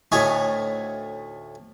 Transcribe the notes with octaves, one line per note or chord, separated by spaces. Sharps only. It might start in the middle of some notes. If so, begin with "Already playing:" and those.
D2 A2 A3 D#4 C#5 G#5